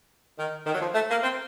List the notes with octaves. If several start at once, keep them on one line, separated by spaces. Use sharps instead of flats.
D#3
D#3
F#3
F3
A3
A#3
C4